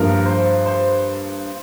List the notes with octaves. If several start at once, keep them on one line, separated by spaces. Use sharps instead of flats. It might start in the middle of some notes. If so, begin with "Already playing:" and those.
Already playing: G2 F3 A#3 A#4
C5
C5